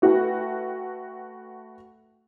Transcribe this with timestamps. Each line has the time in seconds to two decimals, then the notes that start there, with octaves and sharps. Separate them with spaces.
0.02 A3 F#4 B4 G5